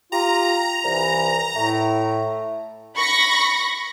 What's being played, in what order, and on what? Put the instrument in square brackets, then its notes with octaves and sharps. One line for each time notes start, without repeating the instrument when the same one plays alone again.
[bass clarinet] F4 [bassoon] G4 [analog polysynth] A#5
[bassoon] C2 [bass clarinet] E3
[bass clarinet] A2 [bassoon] A3
[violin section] B5 C#6 A#6